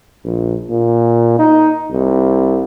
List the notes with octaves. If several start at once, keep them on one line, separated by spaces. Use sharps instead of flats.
A#1
A#2
D#4
C2